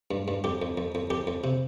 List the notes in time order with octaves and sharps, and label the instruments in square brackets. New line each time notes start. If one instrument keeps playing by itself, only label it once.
[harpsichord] G2
G2
F2 G4
F2
F2
F2
F2 G4
F2
C3